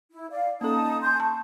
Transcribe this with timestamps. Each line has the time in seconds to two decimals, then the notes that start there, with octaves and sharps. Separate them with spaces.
0.12 E4
0.31 D5 F5
0.61 A#3 C#4 D#4 A4 A5 D#6
1.02 G#5 C6 G6
1.20 A5 C#6